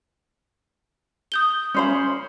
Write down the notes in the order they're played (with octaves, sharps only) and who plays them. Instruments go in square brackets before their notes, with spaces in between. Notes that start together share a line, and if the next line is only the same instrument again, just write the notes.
[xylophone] D#6 G6 G7
[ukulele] C#4 C5 B5